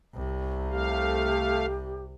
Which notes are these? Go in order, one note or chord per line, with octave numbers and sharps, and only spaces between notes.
C2 C3
A3 G4 F5